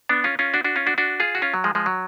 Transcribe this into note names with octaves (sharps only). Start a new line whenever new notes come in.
B3 D4
C#4 F4
C#4 F4
D4 F#4
D4 F#4
C#4 F4
D4 F#4
D4 F#4
F4 G#4
F#4
C#4 F4
F#3
F3 G#3
F3 G#3
F#3